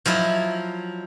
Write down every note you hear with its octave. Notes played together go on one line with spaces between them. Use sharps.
F3 F#3 E4 D#5